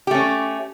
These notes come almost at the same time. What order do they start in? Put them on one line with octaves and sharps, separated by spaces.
G4 A3 C#4